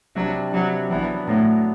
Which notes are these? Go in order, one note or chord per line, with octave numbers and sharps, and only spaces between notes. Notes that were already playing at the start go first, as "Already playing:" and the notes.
C3 F#3 G3 D4
C3 F#3 G3 D4
E3 F#3 B3 D4
A2 F#3 B3 D4